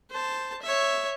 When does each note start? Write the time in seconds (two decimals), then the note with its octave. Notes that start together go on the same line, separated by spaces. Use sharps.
0.11 C5 A5
0.62 C#5 E5